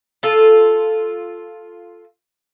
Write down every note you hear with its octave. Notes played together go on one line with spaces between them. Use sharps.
F4 A4